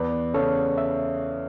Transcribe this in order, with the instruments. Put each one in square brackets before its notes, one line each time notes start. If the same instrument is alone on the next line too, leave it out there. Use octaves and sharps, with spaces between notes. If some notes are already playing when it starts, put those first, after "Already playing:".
Already playing: [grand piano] E2 [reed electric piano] B4 D5
[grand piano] C#3 [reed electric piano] A4 C#5
[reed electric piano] E5